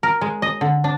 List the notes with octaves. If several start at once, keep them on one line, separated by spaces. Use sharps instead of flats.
A#4
G#3
D#5
D3
D4